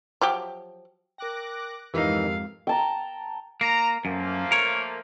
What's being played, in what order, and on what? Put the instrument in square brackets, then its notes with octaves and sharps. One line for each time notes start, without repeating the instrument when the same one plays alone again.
[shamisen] F3 F#3 G4
[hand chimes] A#4 G5 [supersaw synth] D6 F#6 A#6
[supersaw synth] F2 [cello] G#2 F5 [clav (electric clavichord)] E3 D#4 [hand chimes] G4 A#4 E6
[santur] G5 A5 A#5
[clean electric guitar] A#3 [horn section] A#5
[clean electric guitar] F#2 [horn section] F3 A3 A#3
[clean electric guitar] A#4 C#5